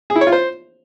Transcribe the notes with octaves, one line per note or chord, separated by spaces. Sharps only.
G#4
E4
C#5
F4
C5